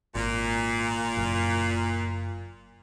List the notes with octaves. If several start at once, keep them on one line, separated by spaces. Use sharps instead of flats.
G#1 A#2
F#1